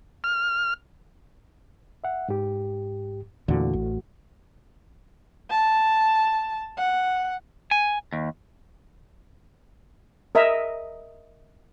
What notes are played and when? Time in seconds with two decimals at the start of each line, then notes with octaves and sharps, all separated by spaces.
0.24 F6
2.04 E5 F#5
2.28 G#2 G4
3.48 E2 A#2 D3 E3 A3 F#4
3.73 A1
5.50 A5
6.78 F#5
7.71 G#5
8.13 D#2
10.35 A#4 D#5 E5 A#5